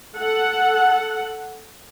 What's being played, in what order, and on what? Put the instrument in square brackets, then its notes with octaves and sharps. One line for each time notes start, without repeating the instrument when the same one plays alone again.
[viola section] A4 F#5